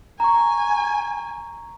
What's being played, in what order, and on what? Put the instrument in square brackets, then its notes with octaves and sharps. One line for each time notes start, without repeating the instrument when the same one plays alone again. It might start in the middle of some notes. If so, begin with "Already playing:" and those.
[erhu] G#5 [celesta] A#5 C#6